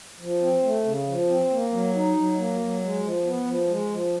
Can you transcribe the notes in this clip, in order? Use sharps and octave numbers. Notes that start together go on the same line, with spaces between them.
F3
C4
A3
C#3
F3
C4
A#3
F#3
D#4
F#3
A#3
F#3
G#3
F3
B3
F3
G#3
F3